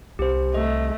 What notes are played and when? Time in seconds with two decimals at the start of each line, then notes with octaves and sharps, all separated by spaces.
0.19 C2 G4 C5
0.54 A3 D#5